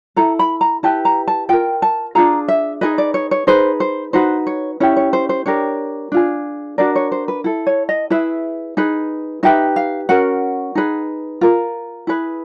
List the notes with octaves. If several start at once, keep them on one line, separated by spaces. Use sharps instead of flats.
E4 A4 A#5
B5
A#5
E4 G4 B4 A5
A#5
A5
F4 A#4 G5
A5
D4 F4 G#4 A#5
E5
D#4 G#4 B4 D#5
D5
C#5
C#5
D#4 G#4 B4 C5
C5
D#4 F#4 B4 C5
C#5
C#4 E4 G4 C#5
C#5
C5
C5
D4 G4 A#4 C#5
D4 F4 G#4
D4 F#4 A#4 D5
C#5
C5
B4
E4 A4
C#5
D#5
E4 G#4 B4 E5
D#4 G#4 B4
D#4 G4 B4 E5
F5
C#4 F#4 A#4 F#5
D#4 G#4 B4
F4 A#4
E4 G#4 B4